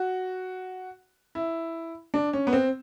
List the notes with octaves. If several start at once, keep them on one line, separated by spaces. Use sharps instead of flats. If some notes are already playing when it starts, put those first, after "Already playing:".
Already playing: F#4
E4
D4
C#4
B3
C4